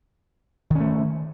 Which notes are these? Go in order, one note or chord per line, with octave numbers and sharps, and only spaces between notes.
D#3 A3 C#4